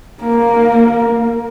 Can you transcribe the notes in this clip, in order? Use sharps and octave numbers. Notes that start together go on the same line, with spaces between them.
A#3 A#4